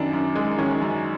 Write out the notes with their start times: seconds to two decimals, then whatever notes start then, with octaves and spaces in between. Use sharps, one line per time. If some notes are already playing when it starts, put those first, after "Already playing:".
Already playing: F#2 D#3 D4
0.13 F#2
0.36 G#3
0.58 D#3 C#4
0.81 F#2